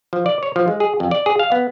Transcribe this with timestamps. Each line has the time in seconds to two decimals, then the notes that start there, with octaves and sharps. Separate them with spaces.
0.13 F3
0.26 D5
0.43 C#5
0.56 F3
0.68 G#3
0.80 G#4
1.00 F2
1.11 D5
1.26 G#4
1.39 F5
1.52 B3